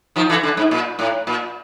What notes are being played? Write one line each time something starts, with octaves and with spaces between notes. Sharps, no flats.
D#3 F3
D3 E3
D3
G#2
A#2
A2
A#2